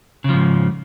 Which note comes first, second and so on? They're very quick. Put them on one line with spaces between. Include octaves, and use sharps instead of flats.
C#3 F3 G#2